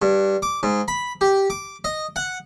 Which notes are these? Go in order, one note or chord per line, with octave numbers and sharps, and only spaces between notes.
G2
D6
G#2
B5
G4
D6
D#5
F#5